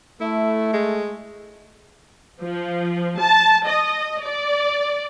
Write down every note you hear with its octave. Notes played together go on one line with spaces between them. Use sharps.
A3 E4
G#3
F3
A5
D#5
D5